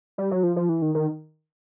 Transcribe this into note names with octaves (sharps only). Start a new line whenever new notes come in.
G3
F#3
F3
F3
E3
D#3
D#3